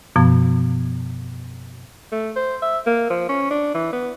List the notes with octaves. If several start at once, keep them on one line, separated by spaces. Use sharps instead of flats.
F#2 B2 F3 B3
A3
C5
E5
A#3
F3
C#4
D4
E3
B3